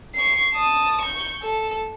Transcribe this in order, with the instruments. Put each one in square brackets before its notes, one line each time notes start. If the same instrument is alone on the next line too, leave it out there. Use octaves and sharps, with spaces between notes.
[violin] C#6 C7
A5 D#6
C#6 G6
A4